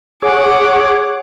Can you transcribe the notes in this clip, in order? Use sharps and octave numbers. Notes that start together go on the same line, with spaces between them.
G#4 C#5 F#5 D6